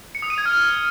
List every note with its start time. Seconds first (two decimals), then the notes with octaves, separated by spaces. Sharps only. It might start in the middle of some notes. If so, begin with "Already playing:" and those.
0.15 C#7
0.22 D#6
0.30 D#7
0.38 G#6
0.46 F6